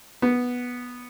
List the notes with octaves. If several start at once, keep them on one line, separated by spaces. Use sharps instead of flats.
B3